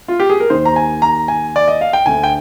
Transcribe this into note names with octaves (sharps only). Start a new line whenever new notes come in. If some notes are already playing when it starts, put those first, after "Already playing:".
F4
G4
G#4
A#4
D#2 D#3 C5
A#5
G#5
A#5
G#5
D5
D#5
F5
G5
D2 D3 G#5
G5